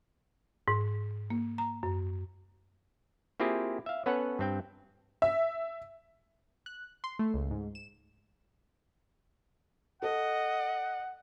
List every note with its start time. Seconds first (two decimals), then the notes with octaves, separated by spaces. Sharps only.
0.68 G#2
1.30 A#3
1.58 A#5
1.83 F#2
3.40 A#3 C4 E4 F4 G4 G#4
3.86 E5 F5
4.06 B3 C#4 A4 B4 C#5 F#5
4.39 G2 C4 G5
5.22 E5
6.66 F#6
7.04 C6
7.19 A3
7.34 C#2
7.50 G#2
7.75 E7
10.02 A4 D#5 F#5